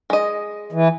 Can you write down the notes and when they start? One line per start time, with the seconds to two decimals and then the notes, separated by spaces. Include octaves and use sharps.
0.10 G#3 D#5
0.72 E3